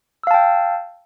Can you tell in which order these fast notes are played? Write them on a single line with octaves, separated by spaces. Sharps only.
E6 F5 A5 G5